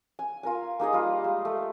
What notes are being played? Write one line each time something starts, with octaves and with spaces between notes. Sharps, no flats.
G#5
F4 A#4 G#5
A#3 D#4 G#4 D#5
G3 F4
G#3
A3